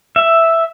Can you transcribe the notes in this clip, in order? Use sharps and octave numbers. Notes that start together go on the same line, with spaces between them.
E5